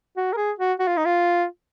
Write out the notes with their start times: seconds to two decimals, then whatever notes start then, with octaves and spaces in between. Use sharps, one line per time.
0.17 F#4
0.33 A#4
0.37 G#4
0.59 F#4
0.80 F#4
0.88 F4
0.97 D#4
1.05 F4